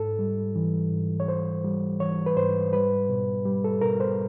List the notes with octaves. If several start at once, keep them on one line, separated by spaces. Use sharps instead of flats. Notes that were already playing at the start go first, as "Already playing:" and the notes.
Already playing: G#2 A4
G3
E3
G#2
C#5
G#2 C5
G3
E3 C#5
B4
G#2 C5
G3 B4
B2
G3
A4
B2 A#4
C5